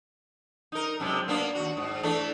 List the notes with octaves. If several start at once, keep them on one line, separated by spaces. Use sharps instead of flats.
D#4 A#4
F#2 C3 G#3
A#3 B3 D4
D#2 F#4
G#2
E3 A3 D4